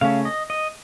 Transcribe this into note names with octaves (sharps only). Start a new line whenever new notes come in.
C#3 A3 C#4 F5
D#5
D#5